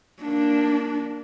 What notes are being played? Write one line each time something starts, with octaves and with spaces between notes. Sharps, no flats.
A#3 D4